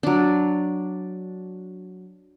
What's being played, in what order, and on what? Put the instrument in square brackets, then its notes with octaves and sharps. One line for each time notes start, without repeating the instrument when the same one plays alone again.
[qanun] F#3 D4